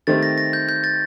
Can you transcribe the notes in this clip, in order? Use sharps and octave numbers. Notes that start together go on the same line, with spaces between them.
D#3 A3 C4 G4 C5 A6
A#6
A#6
G6
G6
A6